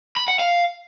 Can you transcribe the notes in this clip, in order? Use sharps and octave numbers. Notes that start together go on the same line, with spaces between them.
B5
F#5
F5